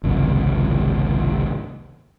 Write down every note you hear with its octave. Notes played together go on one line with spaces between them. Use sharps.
G#1 C#2 F#2 C3